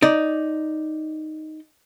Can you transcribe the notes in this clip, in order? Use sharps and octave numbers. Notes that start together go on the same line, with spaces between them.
D#4 D5